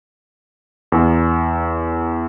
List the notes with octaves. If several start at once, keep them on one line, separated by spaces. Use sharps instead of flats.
E2